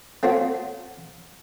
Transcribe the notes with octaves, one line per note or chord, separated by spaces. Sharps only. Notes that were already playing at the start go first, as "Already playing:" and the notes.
A3 C4 C#4 F4 F#4